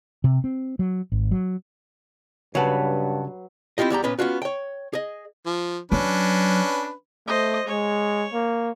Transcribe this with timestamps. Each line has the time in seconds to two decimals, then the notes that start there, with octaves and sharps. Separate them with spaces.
0.24 C3
0.44 C4
0.79 F#3
1.12 G#1
1.31 F#3
2.55 G2 C#3 F#3 B4 C#5 F#5 A5
3.78 C4 E4 F4 G4 D#5
3.90 E2 G3 G4 A#5
4.04 A#2 B3 C#4 B4
4.19 B3 C#4 F4 F#4
4.42 C#5 G5
4.93 G#4 D#5
5.46 F3
5.92 F#3 C#4 D4 B4
7.27 A3 C5 D#5
7.67 G#3 C#5
8.33 A#3